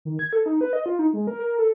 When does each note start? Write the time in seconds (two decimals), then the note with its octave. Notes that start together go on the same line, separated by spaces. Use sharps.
0.05 D#3
0.19 G#6
0.33 A4
0.46 D#4
0.61 B4
0.73 D#5
0.86 F4
0.99 D#4
1.13 G#3
1.27 A#4
1.40 A#4
1.58 A4